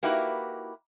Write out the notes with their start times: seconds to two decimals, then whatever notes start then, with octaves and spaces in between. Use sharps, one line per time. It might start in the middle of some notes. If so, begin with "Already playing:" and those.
0.03 A#3 D#4 E4 F#4 G4 B4